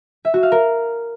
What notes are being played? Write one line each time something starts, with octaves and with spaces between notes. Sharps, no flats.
E5
F#4
F5
A#4